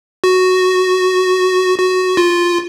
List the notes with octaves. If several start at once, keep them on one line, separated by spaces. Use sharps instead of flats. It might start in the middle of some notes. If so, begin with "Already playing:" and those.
F#4
F#4
F4